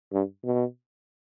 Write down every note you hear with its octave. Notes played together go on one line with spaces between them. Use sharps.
G2
B2